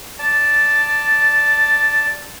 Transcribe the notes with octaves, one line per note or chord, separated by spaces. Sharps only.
D5 A5